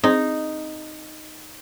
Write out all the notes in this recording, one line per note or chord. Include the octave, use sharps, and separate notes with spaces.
C4 D#4 G#4